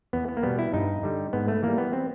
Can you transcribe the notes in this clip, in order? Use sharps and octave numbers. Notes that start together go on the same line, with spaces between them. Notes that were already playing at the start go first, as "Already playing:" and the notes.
E2 B3
B3
A#3
B2 G3 B3
E4
G2 D#4
D3 G3
G#2 B3
A3
E3 G3 A#3
B3
C4